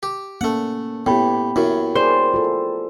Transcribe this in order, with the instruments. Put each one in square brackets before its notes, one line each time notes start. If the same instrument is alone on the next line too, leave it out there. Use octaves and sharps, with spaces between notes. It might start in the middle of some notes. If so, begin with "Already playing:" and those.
[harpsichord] G4
[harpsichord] A3 F#5 [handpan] A#3 C#4
[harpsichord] A2 [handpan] B3 G4 [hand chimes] G5 B5
[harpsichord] F#2 F#3 [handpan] E4
[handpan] G#4 A#4 D5 [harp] C5
[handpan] F4 A4